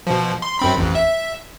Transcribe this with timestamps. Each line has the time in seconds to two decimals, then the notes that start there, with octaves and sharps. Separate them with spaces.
0.07 B2 F3
0.42 C6
0.59 F#2 C4 B5
0.77 A1 F2
0.95 E5